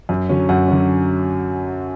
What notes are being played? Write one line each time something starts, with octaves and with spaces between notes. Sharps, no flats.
F#2
D3 F#3 C#4
F#2 F#5
D3 F#3 C#4